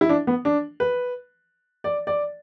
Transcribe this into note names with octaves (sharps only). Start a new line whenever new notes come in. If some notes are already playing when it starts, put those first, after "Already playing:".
E4
D4
B3
D4
B4
D5
D5